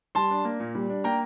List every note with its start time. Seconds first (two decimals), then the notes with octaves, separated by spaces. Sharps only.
0.15 G3 A5 C6
0.31 D4
0.45 A#3
0.60 A#2
0.75 G3
0.89 D4
1.04 A#3 G5 A#5